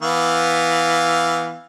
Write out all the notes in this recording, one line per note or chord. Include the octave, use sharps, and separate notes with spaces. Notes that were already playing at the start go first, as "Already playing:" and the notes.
E3 B3 F5